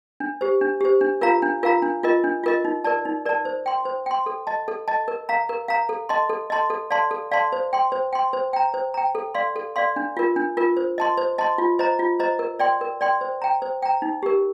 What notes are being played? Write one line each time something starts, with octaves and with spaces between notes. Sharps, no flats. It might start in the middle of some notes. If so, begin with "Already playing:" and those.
D4
G4 C5
D4
G4 C5
D4
F4 A#4 F5 A#5
D4
F4 A#4 F5 A#5
D4
F4 A#4 D#5
D4
F4 A#4 D#5
D#4
A#4 D5 A5
D#4
A#4 D5 A5
C5
G5 C6
C5
G5 C6
A4
D#5 A5
A4
D#5 A5
A#4
F5 A#5
A#4
F5 A#5
A4
D#5 A5 C6
A4
D#5 A5 C6
A4
D5 F5 A5 C6
A4
D5 F5 A5 C6
C5
G5 C6
C5
G5 C6
C5
G5 A#5
C5
G5 A#5
A4
D5 F5 C6
A4
D5 F5 C6
D4
F4 A#4
D4
F4 A#4
C5
D#5 A5 C6
C5
D#5 A5 C6
F4
C5 D#5 A#5
F4
C5 D#5 A#5
A#4
D5 G5 C6
A#4
D5 G5 C6
C5
G5 A#5
C5
G5 A#5
D#4
G4 A#4